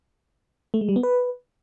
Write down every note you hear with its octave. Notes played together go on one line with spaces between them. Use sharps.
A3
G#3
G3
B3
B4